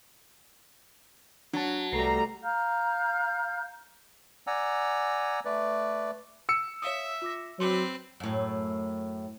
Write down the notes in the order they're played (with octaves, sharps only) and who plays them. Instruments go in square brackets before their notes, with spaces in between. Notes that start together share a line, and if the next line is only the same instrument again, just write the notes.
[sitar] F#3 [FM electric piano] D4 A5
[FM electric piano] C2 B4 C7 [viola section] G3 A3 A#5
[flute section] F5 A#5 F6 G6
[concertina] D5 F#5 G#5 A#5 E6
A3 B4 D5
[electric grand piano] E6 C#7
[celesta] C#5 F5 D#6 [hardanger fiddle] E5
[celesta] F4 D6 A#6
[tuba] F#3 [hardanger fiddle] C4 B4 [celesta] C#5 C6 D6
[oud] F#2 A2